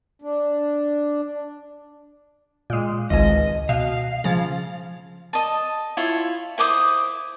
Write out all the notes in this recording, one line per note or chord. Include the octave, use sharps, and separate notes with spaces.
D4
A#2 G#3
G#1 C#2 D#5 G#5
B2 F5
C#3 F3
D#5 A5
E4 F4 C#5
E4 C5 D6 D#6